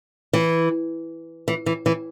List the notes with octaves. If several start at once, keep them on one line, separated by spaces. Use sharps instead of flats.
E3
E3
E3
E3